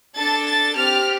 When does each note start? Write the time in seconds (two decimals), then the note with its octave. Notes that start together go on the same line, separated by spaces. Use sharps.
0.17 D4 A4 A6
0.47 A6
0.77 C4 G4 F6